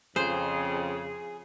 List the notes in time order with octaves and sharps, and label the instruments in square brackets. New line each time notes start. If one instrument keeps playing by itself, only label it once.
[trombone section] F2 [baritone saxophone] C#3 [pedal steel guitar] G#4 [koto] C5